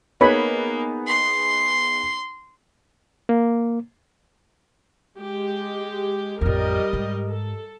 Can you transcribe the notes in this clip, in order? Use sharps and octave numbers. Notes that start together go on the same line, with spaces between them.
A#3 B3 D#4 G#4 B4 C#5 B5
C6
A#3
G#3 G4
A1 F2 G3 A#4 D#5
G#2
A4